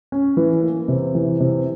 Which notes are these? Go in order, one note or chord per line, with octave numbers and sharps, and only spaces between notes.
C#4
E3
A#3
C3
E3
C3